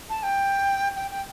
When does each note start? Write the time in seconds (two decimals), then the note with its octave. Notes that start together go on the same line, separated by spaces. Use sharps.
0.10 A5
0.23 G5
0.96 G5
1.11 G5